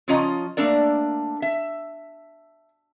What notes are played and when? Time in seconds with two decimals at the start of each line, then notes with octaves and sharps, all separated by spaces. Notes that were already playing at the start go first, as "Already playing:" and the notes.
0.08 C#3 F3 C#4 F4 D#5 A#5
0.57 A3 A#3 D4 A#4 D5
1.42 E5